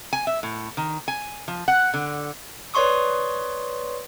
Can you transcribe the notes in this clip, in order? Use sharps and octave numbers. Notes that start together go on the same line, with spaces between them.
G#5
E5
A2
D#3
G#5
F3
F#5
D3
B4 C#5 D5 C6 C#6 D#6